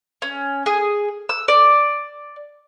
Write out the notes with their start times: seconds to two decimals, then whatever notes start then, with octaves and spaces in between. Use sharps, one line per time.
0.22 C#4
0.66 G#4
1.29 E6
1.48 D5